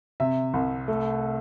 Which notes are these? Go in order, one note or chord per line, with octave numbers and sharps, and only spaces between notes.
C3 E5
C2
A3